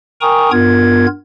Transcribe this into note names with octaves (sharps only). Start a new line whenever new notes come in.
A#4 G5 G#5 A#5 C#6 D#6
G2 B3 F4 A#4 G#6